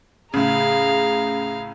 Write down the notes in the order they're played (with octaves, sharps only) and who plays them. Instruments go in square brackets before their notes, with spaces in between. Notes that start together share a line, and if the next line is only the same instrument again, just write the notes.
[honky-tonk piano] A2 C#3 [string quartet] G#4 F5 A#5